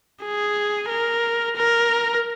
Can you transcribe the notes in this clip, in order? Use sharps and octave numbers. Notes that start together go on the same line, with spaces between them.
G#4
A#4
A#4